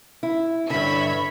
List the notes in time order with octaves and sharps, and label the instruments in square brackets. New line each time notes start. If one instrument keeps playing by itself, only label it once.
[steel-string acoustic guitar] E4
[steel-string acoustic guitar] G2 D3 [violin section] C#5 E5 B5